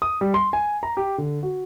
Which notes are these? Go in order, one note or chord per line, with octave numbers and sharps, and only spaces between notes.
D#6
G3
C6
G#5
A#5
G4
D3
F#4